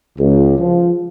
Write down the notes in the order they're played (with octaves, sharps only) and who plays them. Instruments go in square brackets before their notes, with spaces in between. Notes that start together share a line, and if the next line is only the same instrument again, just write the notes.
[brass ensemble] C#2
F3